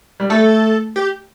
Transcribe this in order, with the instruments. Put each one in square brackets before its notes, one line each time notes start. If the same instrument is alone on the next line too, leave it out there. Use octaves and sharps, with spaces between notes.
[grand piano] G3
[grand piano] A3 [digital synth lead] A4
[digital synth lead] G4